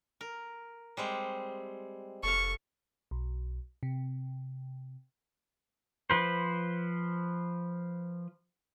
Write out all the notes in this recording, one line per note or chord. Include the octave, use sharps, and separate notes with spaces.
A#4
G3 G#3 C4
F1 A4 F5 C#6
B1
C3
F3 B4 C5